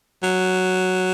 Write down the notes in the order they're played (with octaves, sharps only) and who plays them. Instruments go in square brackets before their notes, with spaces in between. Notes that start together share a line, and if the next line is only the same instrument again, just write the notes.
[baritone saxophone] F#3